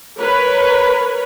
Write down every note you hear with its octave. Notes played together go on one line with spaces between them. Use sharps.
A#4 B4 C#5